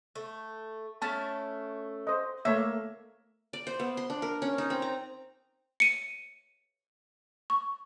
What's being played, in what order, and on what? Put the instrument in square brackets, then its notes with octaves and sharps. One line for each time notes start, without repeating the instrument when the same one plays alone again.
[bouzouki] A3
[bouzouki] A3 C#4 E4 [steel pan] A5
[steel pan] C5 D#5
[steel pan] A3 C#5 E5 [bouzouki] A#3
[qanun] D5
C5
B3
C6
D4
A#4
C#4
D#4
C4
A#5
[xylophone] C#7 D#7
C#6